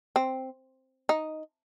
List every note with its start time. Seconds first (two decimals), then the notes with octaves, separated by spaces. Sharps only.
0.16 C4
1.09 D#4